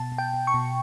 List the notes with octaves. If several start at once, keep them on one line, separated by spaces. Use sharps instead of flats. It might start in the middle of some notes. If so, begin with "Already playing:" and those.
Already playing: B2 A5
B2
G5
B2
C#6
B2